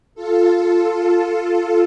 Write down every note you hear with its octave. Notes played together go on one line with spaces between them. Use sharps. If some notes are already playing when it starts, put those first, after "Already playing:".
F4 A4